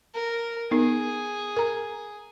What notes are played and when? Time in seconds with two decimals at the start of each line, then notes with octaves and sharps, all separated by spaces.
0.14 A#4
0.71 B3 D#4 G#4 A#4
1.57 A#4 A#5